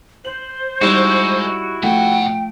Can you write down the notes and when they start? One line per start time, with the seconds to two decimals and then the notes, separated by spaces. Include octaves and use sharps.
0.25 C5 F#7
0.81 G3 G#3 D#4 E4 F#4
1.83 B2 F3 A3 F#5 G5